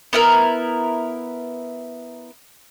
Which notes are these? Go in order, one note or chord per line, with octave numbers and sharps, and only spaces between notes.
B3 E4 A#4